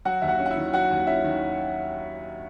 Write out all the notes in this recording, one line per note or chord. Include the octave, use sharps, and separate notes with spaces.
F#3 F#4 F#5
D#2 E5
F#4 F#5
C#4
F#5
E4 E5
D#3
F#3 F#4 F#5
D#2
C#4 E4 E5
D#3